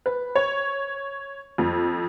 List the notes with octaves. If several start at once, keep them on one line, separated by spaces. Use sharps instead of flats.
B4
C#5
F2